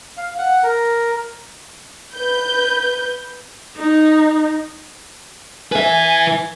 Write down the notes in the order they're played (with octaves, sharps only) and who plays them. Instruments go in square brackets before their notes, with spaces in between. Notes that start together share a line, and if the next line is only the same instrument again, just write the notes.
[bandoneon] F5
F#5
A#4
[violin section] B4 G6
[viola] D#4
[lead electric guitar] B4 E5 [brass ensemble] G#5